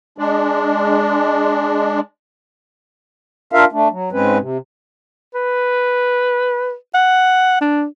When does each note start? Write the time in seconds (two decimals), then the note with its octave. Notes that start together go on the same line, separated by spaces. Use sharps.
0.18 G#3 D4
3.52 D4 F4 A#4 E5 F5
3.72 A3 D4
3.91 F#3
4.12 G#2 G#3 C4 C#4 B4
4.39 C3
5.34 B4
6.94 F#5
7.61 D4